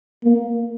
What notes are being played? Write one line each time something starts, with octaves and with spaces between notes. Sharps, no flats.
A#3